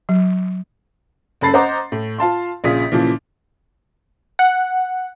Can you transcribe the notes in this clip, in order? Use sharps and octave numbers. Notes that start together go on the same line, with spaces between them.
F#3
F#1 F#2 A4 B5 A6 C7
C5 D#5 F#5 A#5 D6
A2
F4 F5 A5 C6
A#1 C#3 F4 G#4 D#6 B6
A#2 C#3 E3 F3
F#5